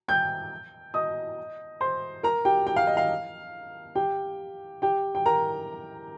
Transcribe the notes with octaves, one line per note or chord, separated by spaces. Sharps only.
G5 G6
D#5 D#6
C5 C6
A#4 A#5
G4 G5
G5
F5
D#5
F5
G4 G5
G4 G5
G5
A#4 A#5